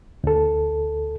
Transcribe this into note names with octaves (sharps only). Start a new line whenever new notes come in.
D2 A4